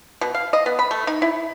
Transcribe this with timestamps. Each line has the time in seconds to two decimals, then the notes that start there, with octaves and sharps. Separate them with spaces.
0.21 B2
0.34 F5
0.53 D#5
0.66 B3
0.79 B5
0.91 A3
1.07 D#4
1.22 E4